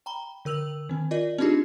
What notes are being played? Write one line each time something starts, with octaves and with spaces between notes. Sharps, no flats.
G5 A#5 B5 G7
D3 A#4 E6 F7 F#7
D#3 C4
F4 A#4 D5 D#5
C4 D4 D#4 F4 G4 G#4